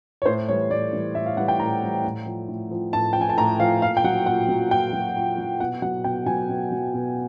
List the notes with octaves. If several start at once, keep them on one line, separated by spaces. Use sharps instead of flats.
C#5
A2 C5
E3 G3 C#5
A2 D5
E3 G3
A2 E5
F5
E3 G3 F#5
G5
A2 A#5
E3 G3
A2
F3
A2
F3
A2 A5
F3 G5
G#5
A5
A2 A#5
F3 F5
A#2 F5
G5
F#3 F#5
A#2 F#5
F#3
A#2 G5
F#3
A#2
F#3
B2 F#5
F#3 F#5
B2 G5
F#3 G#5
B2
F#3
B2